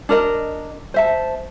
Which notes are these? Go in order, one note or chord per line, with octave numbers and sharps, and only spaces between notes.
D4 A#4 D#5
C5 E5 A5